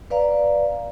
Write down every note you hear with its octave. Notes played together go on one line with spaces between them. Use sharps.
B4 D5 F5 A#5